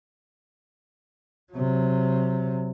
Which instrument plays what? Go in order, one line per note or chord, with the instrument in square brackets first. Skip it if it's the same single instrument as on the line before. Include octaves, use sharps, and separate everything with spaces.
[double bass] C3 F#3